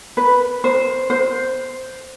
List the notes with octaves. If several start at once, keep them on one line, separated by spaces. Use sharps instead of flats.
B4
C5
C5